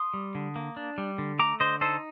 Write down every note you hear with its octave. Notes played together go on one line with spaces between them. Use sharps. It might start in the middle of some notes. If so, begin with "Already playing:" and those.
Already playing: C6 D#6
G3
D3
A#3
D4
G3
D3
A3 A#5 D6
D3 C5 D#5
D#4 A4 C5